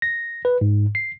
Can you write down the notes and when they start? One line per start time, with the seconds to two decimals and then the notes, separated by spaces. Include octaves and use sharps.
0.02 A#6
0.45 B4
0.61 G#2
0.95 C7